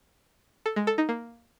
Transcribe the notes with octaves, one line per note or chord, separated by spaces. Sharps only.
A4
G#3
A4
D#4
A#3